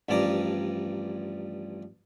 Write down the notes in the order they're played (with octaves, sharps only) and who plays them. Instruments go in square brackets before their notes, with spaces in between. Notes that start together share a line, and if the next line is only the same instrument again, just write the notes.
[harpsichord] A1 G2 F3 D5 A5 A#5